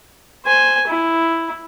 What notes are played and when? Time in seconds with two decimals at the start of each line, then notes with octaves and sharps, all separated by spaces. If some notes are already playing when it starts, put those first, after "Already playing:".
0.45 C5 G#5
0.87 E4